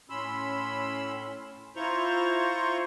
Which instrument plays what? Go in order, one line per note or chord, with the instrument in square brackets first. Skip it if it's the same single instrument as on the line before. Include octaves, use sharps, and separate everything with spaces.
[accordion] A2 C#4 B5 C6 E6
E4 F4 C5 A#5 C6 C#6